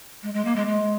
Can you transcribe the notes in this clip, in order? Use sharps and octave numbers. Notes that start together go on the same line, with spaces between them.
G#3
G#3
A#3
G#3
G#3